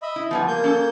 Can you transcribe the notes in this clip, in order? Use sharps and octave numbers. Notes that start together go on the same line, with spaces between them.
D#5 E5 B5
E4
F3 G3 B3 G#5
A#3 G6
C#4 A4